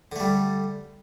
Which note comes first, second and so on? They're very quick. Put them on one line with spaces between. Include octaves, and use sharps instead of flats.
D3 A3 G3